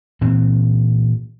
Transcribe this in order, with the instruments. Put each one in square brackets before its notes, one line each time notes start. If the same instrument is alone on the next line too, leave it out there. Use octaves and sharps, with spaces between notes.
[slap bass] A#2 E3 C4